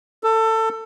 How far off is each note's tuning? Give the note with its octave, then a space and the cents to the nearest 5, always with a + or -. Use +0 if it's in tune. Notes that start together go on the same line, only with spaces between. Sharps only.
A4 +20